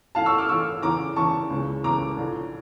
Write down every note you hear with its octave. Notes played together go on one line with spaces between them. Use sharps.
A1 A2 E3 F5 A5
C#6 E6
D6 F6
A1 A2 E3 C#6 E6
E2 C#3 E3 A#5 D6
E2 C#3 E3 A5 C#6
C#2 C#3 E3
C#2 C#3 E3 A#5 D6
A#1 A2 F3